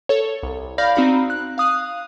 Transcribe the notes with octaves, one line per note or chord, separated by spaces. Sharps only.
A4 C#5
C2
D5 F5 B5 F6 G6 A#6
C4 D#4 F#4 A#5 B5
F#6
F5 D#6 F#6